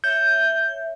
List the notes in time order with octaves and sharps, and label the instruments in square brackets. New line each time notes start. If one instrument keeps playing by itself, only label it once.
[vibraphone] C#5 E5 [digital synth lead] G6